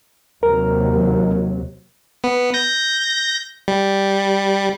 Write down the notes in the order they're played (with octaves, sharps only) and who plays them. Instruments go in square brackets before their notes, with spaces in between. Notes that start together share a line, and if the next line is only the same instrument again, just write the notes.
[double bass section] D#2 C3 F#3 [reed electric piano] A#4
[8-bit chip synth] B3
G6 A#6
G3